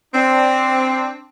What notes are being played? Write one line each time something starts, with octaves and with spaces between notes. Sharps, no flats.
C4 D4